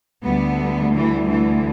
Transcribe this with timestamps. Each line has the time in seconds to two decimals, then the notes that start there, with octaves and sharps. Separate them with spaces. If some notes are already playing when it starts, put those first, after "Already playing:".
0.23 D2 D3 G3 B3
0.93 E3 G3
1.29 E3